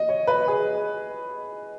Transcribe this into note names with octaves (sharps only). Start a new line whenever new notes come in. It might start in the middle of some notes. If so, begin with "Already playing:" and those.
Already playing: D#5
C#5
B4
G#4